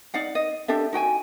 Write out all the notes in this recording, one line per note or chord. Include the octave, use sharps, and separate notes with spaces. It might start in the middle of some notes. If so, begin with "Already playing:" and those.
D#4 D5 F5 F#5
D#5
D4 G4 A4 E5
D#4 F#4 G5 G#5